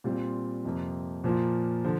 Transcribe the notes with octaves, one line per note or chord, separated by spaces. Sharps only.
A#2 G3 C4 F4
F2 C3 F3 A#3
A#2 F3 A#3 F4
D3 F3